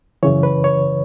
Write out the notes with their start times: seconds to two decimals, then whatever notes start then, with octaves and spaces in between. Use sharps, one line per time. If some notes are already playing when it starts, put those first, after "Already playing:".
0.23 F#2 C#3 E3 C#5
0.43 B4
0.64 C#5